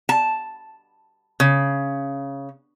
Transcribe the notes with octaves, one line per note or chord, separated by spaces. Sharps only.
A5
C#3